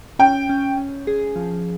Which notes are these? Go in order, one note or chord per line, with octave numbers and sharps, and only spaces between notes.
C#4 G5
C#4
C#4
G#4
F3